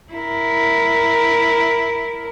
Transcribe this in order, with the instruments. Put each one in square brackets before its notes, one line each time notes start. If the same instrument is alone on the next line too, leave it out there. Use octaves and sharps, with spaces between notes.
[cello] E4 A#4